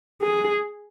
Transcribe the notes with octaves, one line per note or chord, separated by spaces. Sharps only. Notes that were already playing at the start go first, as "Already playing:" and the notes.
G#4